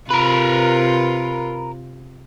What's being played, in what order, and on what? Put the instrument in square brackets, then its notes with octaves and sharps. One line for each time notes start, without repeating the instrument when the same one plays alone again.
[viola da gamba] C3 F4 [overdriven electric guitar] A#4 B4